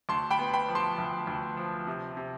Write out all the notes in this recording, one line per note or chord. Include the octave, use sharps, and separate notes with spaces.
D2 A5 C6
G5 B5
B3
G5 B5
F3
A5 C6
D2
D2
F3
C3
C3